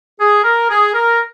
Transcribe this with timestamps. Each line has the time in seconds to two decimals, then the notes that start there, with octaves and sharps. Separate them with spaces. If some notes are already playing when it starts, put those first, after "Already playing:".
0.19 G#4
0.44 A#4
0.69 G#4
0.94 A#4